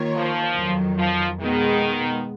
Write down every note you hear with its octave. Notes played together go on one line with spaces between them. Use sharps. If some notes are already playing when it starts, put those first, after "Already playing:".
Already playing: D#3 A#3 F4 A#4 C#5
F3
F2 D#3 F#3
F3
B2 D#3 G#3 B3